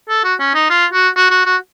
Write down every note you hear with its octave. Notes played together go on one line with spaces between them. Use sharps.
A4
F#4
C#4
D#4
F4
F#4
F#4
F#4
F#4